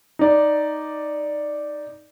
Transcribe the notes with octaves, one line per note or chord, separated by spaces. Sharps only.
D#4 D5